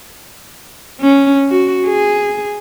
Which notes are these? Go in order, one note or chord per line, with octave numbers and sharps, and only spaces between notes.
C#4
F#4
G#4